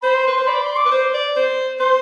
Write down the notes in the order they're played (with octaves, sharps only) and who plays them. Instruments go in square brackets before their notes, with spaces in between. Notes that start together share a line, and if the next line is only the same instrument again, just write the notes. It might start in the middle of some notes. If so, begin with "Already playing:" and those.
[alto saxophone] C5 [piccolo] B5
[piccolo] C6
[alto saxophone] B4 [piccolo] C6
[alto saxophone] C5 [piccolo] C6
[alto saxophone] D5 [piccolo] B5
[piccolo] C6
D6
[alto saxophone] B4
C5
D5
C5
[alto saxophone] C5 [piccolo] C6